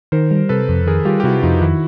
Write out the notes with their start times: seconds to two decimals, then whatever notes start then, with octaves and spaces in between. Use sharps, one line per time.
0.12 D#3 A#4 C5
0.31 G3
0.49 C3 A4 B4
0.69 F2
0.87 D#3 G#4 A#4
1.05 G3 F4 G4
1.20 G4
1.24 C3 E4 F#4
1.43 F2 D#4 F4
1.62 D#3 E4 F#4